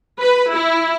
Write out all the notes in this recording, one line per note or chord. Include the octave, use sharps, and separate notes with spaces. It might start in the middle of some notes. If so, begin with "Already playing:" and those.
B4
E4